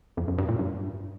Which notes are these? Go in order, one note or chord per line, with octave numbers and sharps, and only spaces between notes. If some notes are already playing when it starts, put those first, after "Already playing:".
F2
F#2
G2
A#2
G2